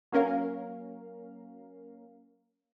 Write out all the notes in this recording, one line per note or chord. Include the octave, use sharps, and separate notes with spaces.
F#3 A#3 C#4 A#4 F5